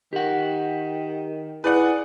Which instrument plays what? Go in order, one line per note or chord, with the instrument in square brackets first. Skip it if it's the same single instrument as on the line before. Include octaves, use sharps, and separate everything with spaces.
[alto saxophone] D#3 [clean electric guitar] G4 F#5
[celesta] E4 [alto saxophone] G#4 [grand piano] B4 D5 F#5